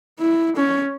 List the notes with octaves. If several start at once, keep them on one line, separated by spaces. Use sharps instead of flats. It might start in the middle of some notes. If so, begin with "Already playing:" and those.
E4
C#4